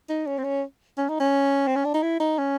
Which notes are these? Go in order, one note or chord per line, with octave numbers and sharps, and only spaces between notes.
D#4
C#4
C4
C#4
C#4
D#4
C#4
C4
C#4
D4
D#4
E4
D#4
C#4